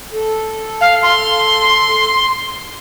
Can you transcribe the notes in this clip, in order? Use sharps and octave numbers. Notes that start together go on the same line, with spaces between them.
A4
F5
C6